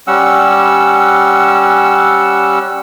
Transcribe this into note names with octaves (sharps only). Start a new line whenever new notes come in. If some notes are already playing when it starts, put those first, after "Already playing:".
G3 C#4 F#5 E6